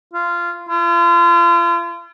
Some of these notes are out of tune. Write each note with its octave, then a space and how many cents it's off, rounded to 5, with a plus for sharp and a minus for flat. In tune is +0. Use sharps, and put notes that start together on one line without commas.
F4 -15
F4 -40